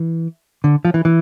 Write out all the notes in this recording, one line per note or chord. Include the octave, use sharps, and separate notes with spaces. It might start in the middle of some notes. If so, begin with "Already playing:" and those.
Already playing: E3
D3
F3
E3
E3